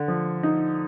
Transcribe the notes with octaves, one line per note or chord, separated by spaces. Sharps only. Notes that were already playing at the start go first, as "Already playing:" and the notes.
Already playing: D3
F3
D#4